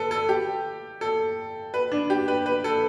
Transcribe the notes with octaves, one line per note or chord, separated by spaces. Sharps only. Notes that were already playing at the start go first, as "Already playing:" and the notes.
Already playing: A4 B4
A4
G4
A4
B4
D4
G4
B4
B4
A4